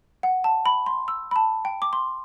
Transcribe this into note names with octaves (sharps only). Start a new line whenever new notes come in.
F#5
A5
B5
C6
E6
B5
A5
G5
D6
C6